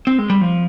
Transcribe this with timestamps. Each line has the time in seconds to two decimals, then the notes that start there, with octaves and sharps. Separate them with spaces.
0.07 C4
0.19 G#3
0.30 G3
0.41 F3